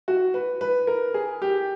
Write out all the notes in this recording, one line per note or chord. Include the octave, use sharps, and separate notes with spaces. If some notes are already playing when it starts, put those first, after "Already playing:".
F#4
B4
B4
A#4
G#4
G4